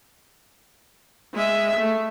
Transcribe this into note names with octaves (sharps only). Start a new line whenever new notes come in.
G#3 E5
A3